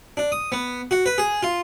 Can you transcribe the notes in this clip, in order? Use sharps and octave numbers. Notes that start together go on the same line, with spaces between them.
D4
D#6
B3
F#4
B4
G#4
F4